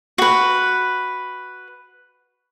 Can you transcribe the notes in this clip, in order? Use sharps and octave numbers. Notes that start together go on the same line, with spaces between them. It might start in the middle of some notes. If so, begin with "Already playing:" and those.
F#4 B4